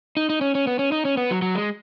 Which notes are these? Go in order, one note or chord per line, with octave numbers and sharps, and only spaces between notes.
D#4
D#4
C#4
C#4
B3
C#4
D#4
C#4
B3
F#3
F#3
G#3